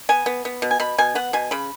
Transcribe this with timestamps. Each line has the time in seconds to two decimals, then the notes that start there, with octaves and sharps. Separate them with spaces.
0.09 B3 G#5
0.26 B3
0.45 B3
0.62 B2
0.71 G#5
0.80 B2 B5
0.98 B2 G#5
1.15 B3 F#5
1.33 B2 G#5
1.51 C#3 B5